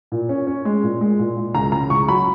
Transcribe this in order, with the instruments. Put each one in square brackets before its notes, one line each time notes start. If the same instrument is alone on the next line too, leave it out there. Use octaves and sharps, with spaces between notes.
[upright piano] A#2
C#4
C#4
G#3
A#2
G#3
A#2
A#2
C#2 A#5
C#3 A#5
C#2 C#6
F#3 B5